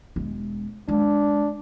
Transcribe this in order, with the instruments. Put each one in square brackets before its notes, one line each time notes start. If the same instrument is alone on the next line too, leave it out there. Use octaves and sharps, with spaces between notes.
[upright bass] E1 G#3
[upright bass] G#3 [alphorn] D4